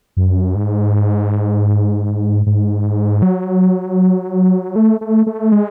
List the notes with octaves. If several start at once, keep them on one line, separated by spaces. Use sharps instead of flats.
F#2
G#2
G#2
F#3
A3
A3
A3
G#3